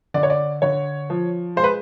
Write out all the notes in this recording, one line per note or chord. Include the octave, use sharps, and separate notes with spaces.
D3 D5
C#5
D5
D3 C#5
F3
G#3 C5
B4